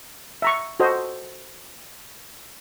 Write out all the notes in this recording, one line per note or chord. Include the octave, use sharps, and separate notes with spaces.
E5 A#5 C#6
F#4 A4 C5 D#5